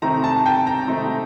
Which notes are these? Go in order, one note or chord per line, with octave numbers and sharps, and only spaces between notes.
C3 D#3 A3 C4 D#4 A#5
A5
G5
A#5
C3 D#3 A3 C4 D#4